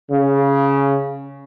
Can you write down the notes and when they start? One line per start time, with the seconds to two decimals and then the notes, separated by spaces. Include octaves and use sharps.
0.12 C#3